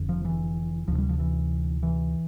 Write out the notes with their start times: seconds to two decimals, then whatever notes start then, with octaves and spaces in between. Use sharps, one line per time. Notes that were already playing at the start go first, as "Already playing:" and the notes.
Already playing: F1 F2 D3
0.09 F3
0.25 E3
0.88 D2 C3 F3
0.98 G3
1.09 F3
1.19 E3
1.83 E3